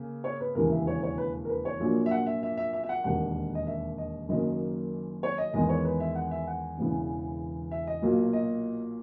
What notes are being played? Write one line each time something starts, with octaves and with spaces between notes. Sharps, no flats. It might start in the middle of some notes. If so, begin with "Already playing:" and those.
Already playing: C#3 A#3
C#5
B4
E1 D#2 C#3 E3 A#4
E5
C#5
C#5
B4
A#4
B4
C#5
A#1 A#2 F#3 A#3
E5
F#5
E5
E5
E5
E5
E5
F#5
E1 D#2 D#3 F#5
D#5
E5
D#5
F#1 F#2 D#3 A#3 D#5
C#5
D#5
E2 D#3 G#3 B3 D#5
C#5
B4
E5
F#5
E5
F#5
E1 E2 C#3 E3
E5
D#5
B1 A#2 F#3 A#3
D#5